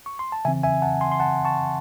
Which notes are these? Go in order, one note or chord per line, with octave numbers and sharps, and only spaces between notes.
C#6
C6
A5
C#3 E3 C4 E5 G#5
E5 G#5
F#5 A5
G#5 C6
C6
F#5 A5
A5 C#6